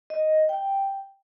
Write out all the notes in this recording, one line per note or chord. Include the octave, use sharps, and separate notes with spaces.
D#5
G5